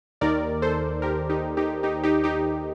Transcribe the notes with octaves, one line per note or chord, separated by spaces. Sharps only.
D#2 D#3 A#4 D5
A4 C5
G4 A#4
D#4 G4
D#4 G4
D#4 G4
D#4 G4
D#4 G4